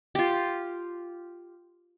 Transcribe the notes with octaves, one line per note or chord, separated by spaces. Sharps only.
F4 G4